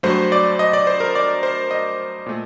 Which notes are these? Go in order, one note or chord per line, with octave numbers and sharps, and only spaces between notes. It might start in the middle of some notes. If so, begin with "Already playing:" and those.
G2 F#3 A3 C5
D5
D#5
D5
C5
A#4
D5
C5
D#5
A#2 A3